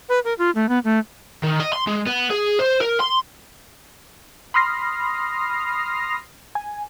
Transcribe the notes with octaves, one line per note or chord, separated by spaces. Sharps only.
B4
A#4
F4
A3
B3
A3
D#3
D#5
C6
G#3
B3
G#4
C5
A#4
C6
B5 C6 D#6 F6 A#6 C7
G#5